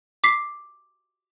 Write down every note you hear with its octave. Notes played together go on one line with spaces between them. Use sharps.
D6 B6 C7